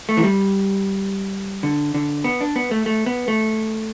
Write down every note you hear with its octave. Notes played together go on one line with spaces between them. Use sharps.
A3
E3
G3
D3
D3
B3
D4
B3
A3
A3
B3
A3